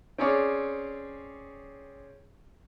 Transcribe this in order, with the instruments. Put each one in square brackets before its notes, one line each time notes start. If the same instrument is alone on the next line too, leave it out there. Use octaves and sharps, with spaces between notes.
[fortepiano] C4 C#4 G#4 C#5 D5